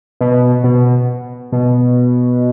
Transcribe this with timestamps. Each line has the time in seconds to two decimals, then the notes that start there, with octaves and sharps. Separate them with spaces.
0.21 B2
0.64 B2
1.52 B2